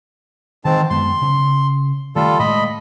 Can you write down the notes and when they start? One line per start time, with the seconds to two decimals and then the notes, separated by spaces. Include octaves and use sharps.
0.65 G#2 D#3 E3 C4 A5
0.90 F#2 G#3 B3 C6
1.22 C#3
2.16 D#3 G3 A3 F4 A4
2.39 A2 G#3 D#5 B5